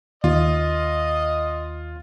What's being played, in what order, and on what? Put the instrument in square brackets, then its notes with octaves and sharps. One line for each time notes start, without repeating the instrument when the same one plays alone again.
[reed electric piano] D#2 [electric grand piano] F4 [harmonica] D#5